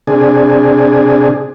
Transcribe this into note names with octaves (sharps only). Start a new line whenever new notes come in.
C3 D4 G#4